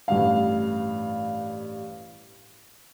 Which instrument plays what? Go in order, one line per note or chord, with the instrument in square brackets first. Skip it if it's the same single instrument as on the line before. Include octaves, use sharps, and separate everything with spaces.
[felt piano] A1 G2 F5